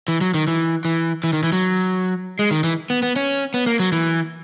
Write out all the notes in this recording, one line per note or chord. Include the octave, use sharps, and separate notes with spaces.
E3
F#3
D#3
E3
E3
E3
D#3
E3
F#3
G#3
D#3
E3
B3
B3
C#4
B3
A#3
F#3
E3